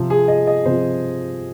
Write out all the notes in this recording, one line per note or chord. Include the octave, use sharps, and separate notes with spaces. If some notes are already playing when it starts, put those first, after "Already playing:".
Already playing: C3 F3 C4
G#4
D#5
D#5
C3 F3 C4 C5